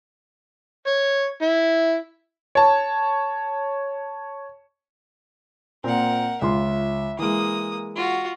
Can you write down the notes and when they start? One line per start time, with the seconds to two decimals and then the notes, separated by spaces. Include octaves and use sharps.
0.87 C#5
1.42 E4
2.55 C#5 A5
5.84 A#2 C4 A#4 F#5
6.42 C#2 F4 E5 C6
7.19 E3 G#3 A#3 D#6
7.95 F4 F#4